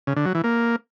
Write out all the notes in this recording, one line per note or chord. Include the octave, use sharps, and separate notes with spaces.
C#3
D3
F#3
E3
A#3